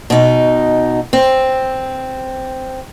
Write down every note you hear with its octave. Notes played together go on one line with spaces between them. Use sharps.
B2 D#4
C4